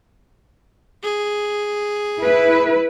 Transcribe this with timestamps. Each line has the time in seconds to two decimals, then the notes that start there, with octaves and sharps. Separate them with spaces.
1.03 G#4
2.21 E4 B4